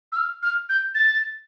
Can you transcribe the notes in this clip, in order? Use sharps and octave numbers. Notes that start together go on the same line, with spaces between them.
E6
F6
F6
G6
A6